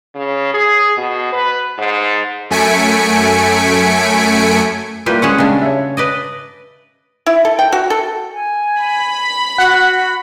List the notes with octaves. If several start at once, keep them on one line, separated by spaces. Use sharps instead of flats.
C#3
G#4
B2
B4
G#2
F#2 A3 G#5 B6 C#7 D7
G3 A#3 E4 F4 G4 B4
G#3 C#4 F#5 C#6
C#3 G3 G#3 D4
C#5 E5
B4 D5 D#5
E4
A4
G5
F#4
A4
G#5
B5
F#4 F#5